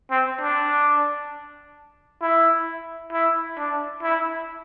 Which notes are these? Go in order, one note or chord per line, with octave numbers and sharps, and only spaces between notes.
C4
D4
E4
E4
D4
E4